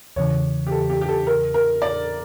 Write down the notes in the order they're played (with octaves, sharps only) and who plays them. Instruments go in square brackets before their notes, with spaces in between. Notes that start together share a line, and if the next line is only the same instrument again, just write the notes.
[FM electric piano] E2 C#3 E3 [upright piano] C#5
[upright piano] G4
A4
G4
G4
A4
A#4
A#4
D5